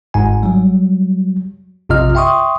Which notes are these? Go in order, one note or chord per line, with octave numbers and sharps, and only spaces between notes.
G1 G#2 G#5
F#3 G3
A#1 F#2 C3 F4 D#5 F6
E5 G5 C6 C#6 D#6